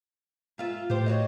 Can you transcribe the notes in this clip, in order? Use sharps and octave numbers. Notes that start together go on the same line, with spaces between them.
G#2 F4 E5
A2 G4 C5
F#4 C#5 D#5